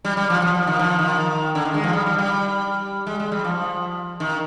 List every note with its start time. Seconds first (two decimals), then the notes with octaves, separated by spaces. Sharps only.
0.05 G3
0.17 G3
0.30 F3
0.42 F3
0.55 F3
0.67 D#3
0.79 F3
0.99 D#3
1.55 D3
1.65 D#3
1.74 G#3
1.84 F3
1.93 G3
2.06 G3
2.18 G3
3.07 G#3
3.20 G#3
3.32 G3
3.44 F3
4.20 D#3